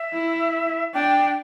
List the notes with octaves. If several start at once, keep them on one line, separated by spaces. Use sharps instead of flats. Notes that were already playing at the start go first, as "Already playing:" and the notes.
Already playing: E5
E4
D4 G5